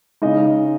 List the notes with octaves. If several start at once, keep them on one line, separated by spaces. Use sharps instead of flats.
C#3 G#3 D#4 D#5